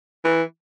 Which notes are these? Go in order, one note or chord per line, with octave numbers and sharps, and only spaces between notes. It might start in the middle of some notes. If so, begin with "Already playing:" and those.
E3